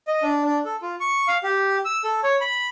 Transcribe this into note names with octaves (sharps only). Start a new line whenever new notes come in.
D#5
D4
D4
A4
F4
C#6
F5
G4
E6
A4
C#5
B5